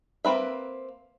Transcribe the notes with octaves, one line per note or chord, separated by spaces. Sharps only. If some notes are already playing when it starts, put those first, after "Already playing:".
A#3 C4 B4 E5